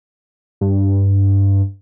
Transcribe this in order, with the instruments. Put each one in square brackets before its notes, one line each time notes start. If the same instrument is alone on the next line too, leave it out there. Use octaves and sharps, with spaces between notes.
[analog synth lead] G2